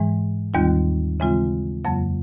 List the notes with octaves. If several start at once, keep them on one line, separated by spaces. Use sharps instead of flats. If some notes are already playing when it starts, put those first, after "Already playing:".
Already playing: G#2 E3 G#3
D#2 D#3 G3 C4 F4
C#3 E3 G#3 C4 F4
F2 C#3 F#3 A#3